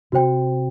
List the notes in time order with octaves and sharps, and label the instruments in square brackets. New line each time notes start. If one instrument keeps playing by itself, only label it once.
[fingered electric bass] C3 [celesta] F#4 C5 G5